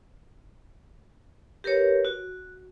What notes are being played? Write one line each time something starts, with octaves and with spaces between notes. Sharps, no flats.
G4 A#4 B4 C#5
F#4